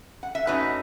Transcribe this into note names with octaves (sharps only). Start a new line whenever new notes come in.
F#5
E5
F#2 F#3 A3 D#4 B4 D#5